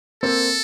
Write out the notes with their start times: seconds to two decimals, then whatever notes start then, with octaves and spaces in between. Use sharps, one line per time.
0.23 A#3 C4 A4